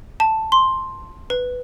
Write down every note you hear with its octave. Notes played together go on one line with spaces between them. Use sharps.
A5
C6
B4